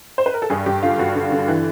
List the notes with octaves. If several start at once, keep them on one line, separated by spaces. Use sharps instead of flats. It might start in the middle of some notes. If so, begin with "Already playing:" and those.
C5
B4
A#4
A4
G2 G#4
G2 G4
D3 F4
G2 F#4
D3
D3
E3